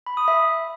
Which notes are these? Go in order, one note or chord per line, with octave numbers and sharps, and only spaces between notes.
B5
D#6
E5